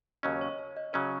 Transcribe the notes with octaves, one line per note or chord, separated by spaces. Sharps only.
D#2 C#3 F#3 C#4 D#5
C#5
C#5
D#5
C#3 F#3 C#4 C#5